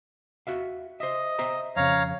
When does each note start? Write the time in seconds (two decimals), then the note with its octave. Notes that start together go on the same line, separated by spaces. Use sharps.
0.47 F#4 E5 F5
1.00 C5 D#5 E5
1.39 C5 E5 A#5
1.76 F2 C#3 C#5 F5 A#5